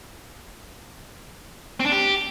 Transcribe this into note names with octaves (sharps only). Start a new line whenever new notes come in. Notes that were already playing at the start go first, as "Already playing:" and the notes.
C4
D4
G4